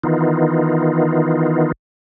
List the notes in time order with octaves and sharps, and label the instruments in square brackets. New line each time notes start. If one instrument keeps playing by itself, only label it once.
[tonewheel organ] D#3 E3 B3 D#4 F4